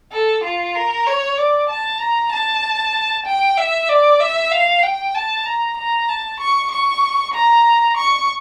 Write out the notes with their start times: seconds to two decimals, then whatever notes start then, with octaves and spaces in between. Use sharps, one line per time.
0.12 A4
0.44 F4
0.75 A#4
1.06 C#5
1.38 D5
1.70 A5
2.01 A#5
2.32 A5
3.26 G5
3.57 E5
3.89 D5
4.20 E5
4.52 F5
4.83 G5
5.14 A5
5.46 A#5
5.78 A#5
6.09 A5
6.40 C#6
6.71 C#6
7.34 A#5
7.97 C#6